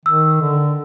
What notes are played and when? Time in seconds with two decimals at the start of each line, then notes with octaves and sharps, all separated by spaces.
0.05 D#3 E6
0.41 D3